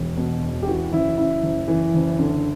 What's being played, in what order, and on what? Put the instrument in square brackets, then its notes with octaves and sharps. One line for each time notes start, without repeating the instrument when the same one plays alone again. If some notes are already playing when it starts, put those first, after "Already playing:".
Already playing: [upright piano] E1
B2
E1
G4
E3 F#4
F#1 E4
F#2 E4
F#1
E3
F#1
D3